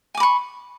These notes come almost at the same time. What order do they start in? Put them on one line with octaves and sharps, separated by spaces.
G#5 D6 B5 C#6